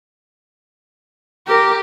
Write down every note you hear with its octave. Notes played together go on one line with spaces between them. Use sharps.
G4 A#4